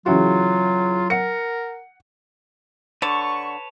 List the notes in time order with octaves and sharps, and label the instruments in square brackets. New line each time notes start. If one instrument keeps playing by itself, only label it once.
[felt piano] C#3 E3 F#4 [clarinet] F#3 [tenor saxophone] F4
[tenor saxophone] A#4 [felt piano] F#5 C#7
[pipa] D3 [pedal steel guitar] B4 C#5 A5 [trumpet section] C#6